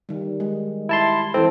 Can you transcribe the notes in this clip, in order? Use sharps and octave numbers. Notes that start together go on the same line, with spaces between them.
D#3 G3
G#3
E4 A5 C6
E3 C4 E4 A4